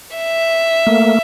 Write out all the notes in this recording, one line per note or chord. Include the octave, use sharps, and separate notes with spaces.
E5
A3 A#3